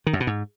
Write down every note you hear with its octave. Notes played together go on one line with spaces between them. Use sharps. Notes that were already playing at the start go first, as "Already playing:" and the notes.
D#3
F#2
B2
G#2